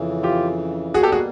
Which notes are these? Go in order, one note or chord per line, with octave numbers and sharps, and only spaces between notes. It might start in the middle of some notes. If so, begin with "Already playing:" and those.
Already playing: F2 C#3 E3
F4 G4
B2 G3 A#3 F#4 G#4
G4 A4
F#4 G#4